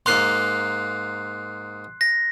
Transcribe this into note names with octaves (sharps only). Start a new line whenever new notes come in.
G#2 A#3 F5 C6 F#6 C7
A#6